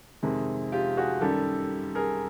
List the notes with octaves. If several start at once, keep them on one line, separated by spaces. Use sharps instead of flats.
F2 C3 D#3 G#3
F4 G4
F#4 G#4
F#2 D#3 G3 G4 A4
G#4 A#4